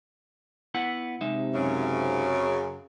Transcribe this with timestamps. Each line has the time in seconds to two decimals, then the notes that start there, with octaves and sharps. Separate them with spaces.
0.74 B3 E4 F#5
1.21 C3 G#3 D#4 E5
1.54 F#2 C#3